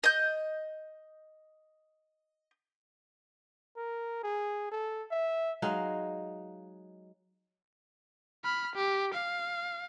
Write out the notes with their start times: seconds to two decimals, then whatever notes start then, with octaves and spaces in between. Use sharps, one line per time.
0.04 D#5 G6
3.76 A#4
4.23 G#4
4.71 A4
5.11 E5
5.62 F#3 G#3 D#4 F5
8.44 B5 F6
8.75 G4
9.14 F5